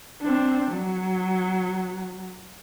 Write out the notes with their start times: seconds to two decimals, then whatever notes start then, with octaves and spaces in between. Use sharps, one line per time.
0.22 C4 D4
0.73 F#3